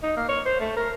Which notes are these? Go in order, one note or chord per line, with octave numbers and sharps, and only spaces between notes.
D#4
A#3
C#5
C5
A3
A#4